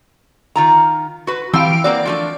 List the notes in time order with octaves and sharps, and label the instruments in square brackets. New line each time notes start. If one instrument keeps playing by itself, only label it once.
[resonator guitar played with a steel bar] D#3 F4 A#5
F#4 B4
[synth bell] E3 F5 D7 [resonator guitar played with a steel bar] C4 G4 A5
[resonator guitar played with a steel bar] A#3 C4 F#4 [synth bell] D5
[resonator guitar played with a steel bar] F3 A3 D4